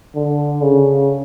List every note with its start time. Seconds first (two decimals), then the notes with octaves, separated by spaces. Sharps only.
0.15 D3
0.62 C#3